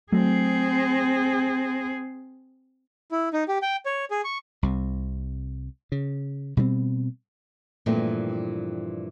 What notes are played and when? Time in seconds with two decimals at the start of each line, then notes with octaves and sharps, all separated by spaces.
0.12 F#3 A3 C4 G#4
3.12 E4
3.33 D#4
3.48 G4
3.62 G5
3.86 C#5
4.11 G#4
4.24 C#6
4.63 C2 C3
5.92 C#3
6.57 B2 G3 B3 C4
7.86 G2 A#2 E3 F3 A3 C4